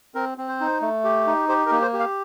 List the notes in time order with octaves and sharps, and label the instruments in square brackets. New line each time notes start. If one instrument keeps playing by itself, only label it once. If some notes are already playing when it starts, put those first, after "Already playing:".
[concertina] C4 A#4
C4
C5
D#4
A3
G4
D#4
G4 C5
A#4
A#3
C5
G4
F5